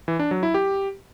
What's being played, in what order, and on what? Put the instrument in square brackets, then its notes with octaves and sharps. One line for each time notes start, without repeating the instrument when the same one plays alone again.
[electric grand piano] E3
D4
F#3
E4
G4